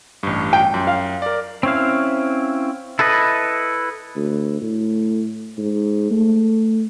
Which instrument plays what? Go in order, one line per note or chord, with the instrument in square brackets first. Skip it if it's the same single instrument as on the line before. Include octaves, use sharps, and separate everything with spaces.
[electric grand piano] A1 G2
[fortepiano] G5
[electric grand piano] F#2
[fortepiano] F5
[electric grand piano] A#4 D5
[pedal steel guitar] C4 C#4 E4 F5
E4 A4 B4 D#5
[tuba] D2
A2
G#2
A3